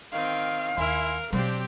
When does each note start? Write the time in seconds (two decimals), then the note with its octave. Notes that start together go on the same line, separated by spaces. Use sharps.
0.12 D#3 C4 F5
0.78 D#2 E4 A#4 G#5 C6
1.32 B2 F#3 C4 D4 G4 C5